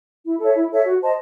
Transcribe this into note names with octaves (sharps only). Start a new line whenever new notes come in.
E4
A4 C#5 E5
E4
A4 C#5 E5
F#4
C5 D#5 A5